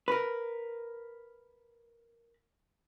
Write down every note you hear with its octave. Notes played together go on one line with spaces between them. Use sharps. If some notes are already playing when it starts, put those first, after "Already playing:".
A#4 B4